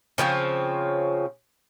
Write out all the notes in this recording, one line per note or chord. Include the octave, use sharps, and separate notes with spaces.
C#3 F3 C4 C#5